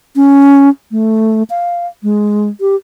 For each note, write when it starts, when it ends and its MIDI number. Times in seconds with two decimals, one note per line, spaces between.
0.16 0.69 61
0.92 1.43 57
1.50 1.87 77
2.03 2.49 56
2.61 2.76 67